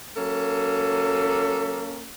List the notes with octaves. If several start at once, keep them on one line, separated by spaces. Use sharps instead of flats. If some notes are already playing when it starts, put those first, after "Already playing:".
F#3 A#3 C#4 A4